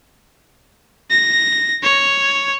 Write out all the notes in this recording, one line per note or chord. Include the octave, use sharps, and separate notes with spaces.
A#6
C#5